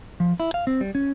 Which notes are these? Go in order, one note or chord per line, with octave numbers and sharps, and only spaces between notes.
F3
E4
F5
C4
G3
C#4